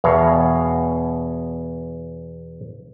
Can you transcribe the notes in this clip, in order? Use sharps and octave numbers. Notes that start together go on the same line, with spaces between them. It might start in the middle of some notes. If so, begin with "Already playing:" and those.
E2 B2 C#5 F5 A#5